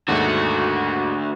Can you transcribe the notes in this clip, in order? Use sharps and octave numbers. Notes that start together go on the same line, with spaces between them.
D#2 G#2 D3 A3 F#4